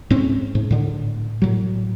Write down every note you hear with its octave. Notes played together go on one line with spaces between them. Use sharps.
G#2 C4 C#4
G#2
A2 D3
A2 F#3